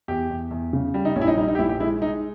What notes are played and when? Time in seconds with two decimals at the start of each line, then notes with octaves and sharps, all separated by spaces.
0.08 E2 G4
0.30 E2
0.51 E2
0.73 C#3
0.94 G3
1.05 D#4
1.16 A#1 C#4
1.21 E4
1.27 D#4
1.37 G3 D#4
1.48 D#4
1.55 G4
1.59 A#1 E4
1.69 G4
1.80 G#3 E4
2.02 G#3 D#4